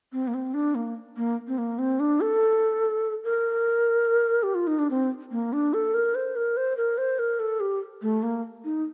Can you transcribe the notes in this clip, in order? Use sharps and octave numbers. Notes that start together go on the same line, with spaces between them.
C4
A#3
C4
D4
A#3
A#3
C4
A#3
C4
D4
A4
A#4
G4
F4
D#4
D4
C4
A#3
D4
A4
A#4
C5
A#4
C5
A#4
C5
A#4
A4
G4
A3
A#3
D#4